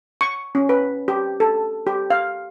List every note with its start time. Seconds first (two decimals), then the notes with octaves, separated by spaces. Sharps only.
0.21 C#6
0.55 C#4
0.69 B4
1.08 G4
1.40 A4
1.87 G4
2.10 F5